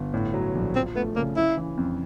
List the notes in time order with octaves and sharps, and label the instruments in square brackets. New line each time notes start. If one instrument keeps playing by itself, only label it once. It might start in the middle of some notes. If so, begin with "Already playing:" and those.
Already playing: [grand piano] G1
A2
F#3
A#1
[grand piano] F3 [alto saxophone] C4
[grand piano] A3 [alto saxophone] B3
[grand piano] C#3 [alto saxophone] A#3
[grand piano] C#3 [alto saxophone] E4
[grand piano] E3
F2